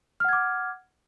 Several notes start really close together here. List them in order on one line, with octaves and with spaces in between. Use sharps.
F6 F#5 G#6 D6